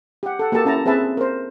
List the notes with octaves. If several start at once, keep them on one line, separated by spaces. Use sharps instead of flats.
G4 F#5
A4 F#5
A#3 F#4 G4 A4 A5 A#5
C#4 E4 A5 A#5
C4 G#4 B4 E5 A5
A#4 C5